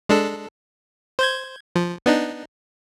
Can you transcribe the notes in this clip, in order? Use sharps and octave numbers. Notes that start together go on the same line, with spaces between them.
G#3 D4 A4
C5 G6 G#6
F3
B3 D4 D#4